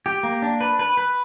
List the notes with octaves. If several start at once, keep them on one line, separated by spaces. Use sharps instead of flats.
G4
A#3
D4
B4
B4
B4